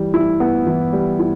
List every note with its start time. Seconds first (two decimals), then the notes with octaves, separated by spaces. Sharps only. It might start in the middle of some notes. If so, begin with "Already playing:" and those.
Already playing: E3 G3
0.14 E4
0.40 B3
0.67 E3
0.93 G3
1.19 E4